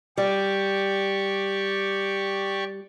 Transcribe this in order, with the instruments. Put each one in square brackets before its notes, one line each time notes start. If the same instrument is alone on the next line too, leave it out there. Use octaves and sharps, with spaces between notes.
[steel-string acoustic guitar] G3 [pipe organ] G4 D5 C#6